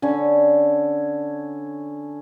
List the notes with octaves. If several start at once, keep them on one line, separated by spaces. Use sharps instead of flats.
D3 C#4